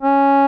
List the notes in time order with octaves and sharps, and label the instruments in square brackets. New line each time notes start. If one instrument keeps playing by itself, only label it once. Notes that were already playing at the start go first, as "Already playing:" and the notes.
[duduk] C#4